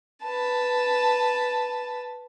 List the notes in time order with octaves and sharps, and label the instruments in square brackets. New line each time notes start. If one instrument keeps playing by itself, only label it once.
[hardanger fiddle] B4 A5